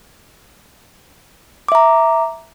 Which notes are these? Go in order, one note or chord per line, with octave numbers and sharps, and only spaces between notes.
E5 A#5 D6